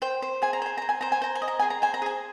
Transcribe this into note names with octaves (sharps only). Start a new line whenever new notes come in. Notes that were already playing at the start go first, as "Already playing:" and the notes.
C5 G5
C5
G#4 G#5
A#5
C5 G#5
C5 A#5
G#5
C5 A#5
G#5
C5 A#5
G#5
D#5
A#5
G#4 G#5
A#5
C5 G#5
A#5
G#4 G#5